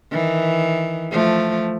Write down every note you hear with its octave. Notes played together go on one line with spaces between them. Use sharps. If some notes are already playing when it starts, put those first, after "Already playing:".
D#3 E3
F3 A3